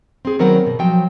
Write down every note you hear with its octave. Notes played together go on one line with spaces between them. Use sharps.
C4 G#4
D#3 F#3 B3 C4 A#4 F#5
B2
F3 F#3 G5